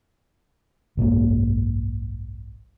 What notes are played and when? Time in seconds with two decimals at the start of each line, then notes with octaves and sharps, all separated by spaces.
0.97 F#1 B1 G#2 A#3